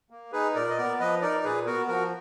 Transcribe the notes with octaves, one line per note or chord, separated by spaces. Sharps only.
A#3
D#4 G#4 B4
A#2 A#4 D5
D#5
B3 A#4 D5
F3 B4 D#5
D#4 A#4 D5
D5
A#2 G#4 B4
B3 F#4 A#4
F3 F#4 A#4